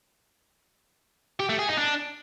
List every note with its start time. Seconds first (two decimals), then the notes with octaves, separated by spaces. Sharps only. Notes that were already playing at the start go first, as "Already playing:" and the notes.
1.40 G4
1.49 A3
1.59 G#4
1.68 D#4
1.78 D4